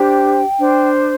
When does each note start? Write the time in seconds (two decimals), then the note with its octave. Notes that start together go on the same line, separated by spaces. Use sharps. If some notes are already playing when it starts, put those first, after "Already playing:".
Already playing: D4 G4 C5 G5
0.57 D4 C5